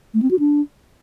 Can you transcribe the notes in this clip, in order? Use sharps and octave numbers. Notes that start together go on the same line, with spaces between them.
A3
C4
F#4
D4